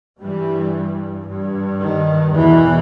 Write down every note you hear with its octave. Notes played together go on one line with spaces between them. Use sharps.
G2 E3 G3
G2
D#3
E2 B2 E3